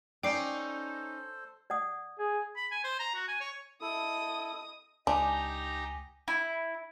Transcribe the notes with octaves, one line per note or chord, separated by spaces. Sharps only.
C#4 D#4 A4 C5 D5 G5 D6 C7
D5 F#5 D#6
G#4
B5
G#5
C5
A#5
F#4
G#5
C#5
E4 A4 D#5 D#6
C#2 D4 D#4 G4 G#5 A#5
E4